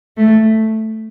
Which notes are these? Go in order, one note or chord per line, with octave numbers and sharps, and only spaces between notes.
A3